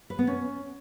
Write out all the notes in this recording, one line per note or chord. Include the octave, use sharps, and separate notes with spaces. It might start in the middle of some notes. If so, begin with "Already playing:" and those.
B4
B3
C#4